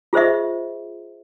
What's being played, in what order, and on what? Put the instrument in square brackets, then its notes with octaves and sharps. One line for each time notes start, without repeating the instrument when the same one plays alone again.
[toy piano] F4 G#4 C5 D#5 E5